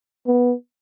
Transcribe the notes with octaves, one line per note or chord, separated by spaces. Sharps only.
B3